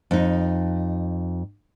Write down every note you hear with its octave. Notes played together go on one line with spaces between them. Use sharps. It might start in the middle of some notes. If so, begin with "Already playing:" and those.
F2 D#4